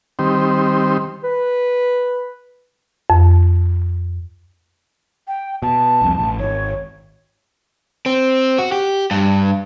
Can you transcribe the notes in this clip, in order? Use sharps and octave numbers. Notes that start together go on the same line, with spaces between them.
D#3 G3 C4
B4
F2
G5
B2 A5
C2 F2
A1
G#1 C#5
C4
F#4
G4
G2